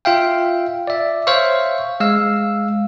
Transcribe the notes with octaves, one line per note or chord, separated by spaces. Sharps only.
F4 E5 F5 G5
D5 E5
C5 C#5 E5 F5 C#6
G#3 F5 E6